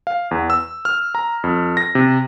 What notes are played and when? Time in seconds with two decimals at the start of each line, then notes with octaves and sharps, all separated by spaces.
0.07 F5
0.31 E2
0.50 E6
0.85 F6
1.15 A#5
1.44 F2
1.77 A#6
1.95 C3